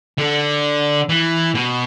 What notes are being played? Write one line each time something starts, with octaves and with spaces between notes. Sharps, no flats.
D3
E3
B2